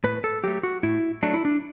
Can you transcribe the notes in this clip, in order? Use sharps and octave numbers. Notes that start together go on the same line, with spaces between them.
A2 B4
A4
F#3 A3 G4
F#4
A2 E4
F#3 A3 D4
E4
D4